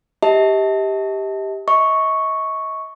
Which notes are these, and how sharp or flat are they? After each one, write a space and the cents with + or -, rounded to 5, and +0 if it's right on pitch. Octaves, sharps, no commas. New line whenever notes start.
G4 +0 D#5 +45 A5 +5
D#5 +40 C#6 +0